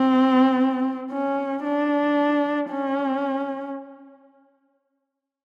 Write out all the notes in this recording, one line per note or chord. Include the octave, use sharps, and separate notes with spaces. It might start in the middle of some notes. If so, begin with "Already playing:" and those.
Already playing: C4
C#4
D4
C#4